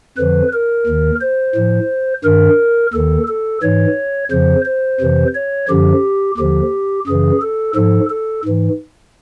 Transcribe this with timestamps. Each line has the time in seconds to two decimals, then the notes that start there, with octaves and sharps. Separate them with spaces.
0.17 F2 D3 F3 B4
0.53 A#4
0.86 D#2 D#3
1.21 C5
1.55 A2 F3
2.24 G2 D#3 A#4
2.93 D#2 D#3 A4
3.27 A4
3.62 G#2 E3 C#5
4.31 F2 C#3 F3 C5
4.66 C5
5.00 F2 C3 E3
5.35 C#5
5.68 F#2 D3 F3 G4
6.37 D#2 D3 F3 G4
7.07 F#2 C#3 E3 G#4
7.41 A4
7.75 G#2 F3 A4
8.10 A4
8.45 G#2 E3